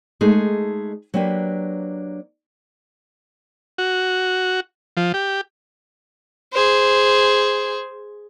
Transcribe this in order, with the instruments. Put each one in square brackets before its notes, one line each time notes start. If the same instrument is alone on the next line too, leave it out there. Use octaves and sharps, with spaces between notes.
[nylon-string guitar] G#3 A3 D#4 G#4 A4
F#3 A#3 D4 G4 B4
[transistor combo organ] F#4
F3
G4
[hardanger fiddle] G#4 C5